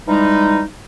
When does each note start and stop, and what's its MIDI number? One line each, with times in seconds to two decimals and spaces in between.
0.08 0.62 52
0.08 0.62 55
0.08 0.62 56
0.08 0.62 63